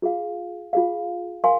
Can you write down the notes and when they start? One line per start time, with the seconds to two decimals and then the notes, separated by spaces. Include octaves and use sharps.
0.02 F4 G#4 F5
0.73 F4 G#4 F5
1.44 A#4 F5 G#5 C6